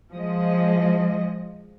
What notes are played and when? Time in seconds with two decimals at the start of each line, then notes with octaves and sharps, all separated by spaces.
0.12 F3 G#3 D#5